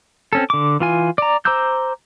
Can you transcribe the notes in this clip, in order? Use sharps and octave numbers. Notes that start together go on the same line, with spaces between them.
C4 C#4 A4
D3 D6
E3 F4 G#5
D5 A#5
C5 A#5 D6 E6 G6